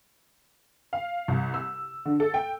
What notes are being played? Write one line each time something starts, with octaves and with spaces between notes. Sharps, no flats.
F5
C2
E6
D3
A4
G5